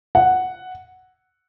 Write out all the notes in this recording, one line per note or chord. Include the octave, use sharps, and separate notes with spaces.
F#5